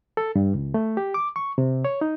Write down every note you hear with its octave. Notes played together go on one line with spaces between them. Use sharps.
A4
G2
C#2
A3
G4
D6
C#6
C3
C#5
D#4